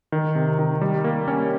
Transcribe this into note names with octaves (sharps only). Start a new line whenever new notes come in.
D#3
C3
D#3
G3
A#3
C#4